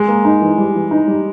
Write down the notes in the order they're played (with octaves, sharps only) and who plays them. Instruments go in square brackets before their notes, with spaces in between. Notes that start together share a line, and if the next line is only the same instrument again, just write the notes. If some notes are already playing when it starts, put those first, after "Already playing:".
Already playing: [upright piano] G#3
[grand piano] A#3
D#4
E3
G3
E3
D#4
G3